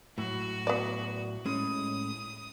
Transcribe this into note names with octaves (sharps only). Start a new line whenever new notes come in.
A2 F#3 F#4
B3 D5
A2 G#3 C#4 D#6